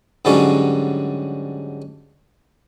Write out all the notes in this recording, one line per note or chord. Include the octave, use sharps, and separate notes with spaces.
G#2 D3 F#3 G3 C#4 F4